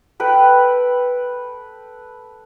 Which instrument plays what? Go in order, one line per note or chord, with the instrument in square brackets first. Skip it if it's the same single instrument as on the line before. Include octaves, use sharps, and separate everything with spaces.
[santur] A4 B4 G5 B5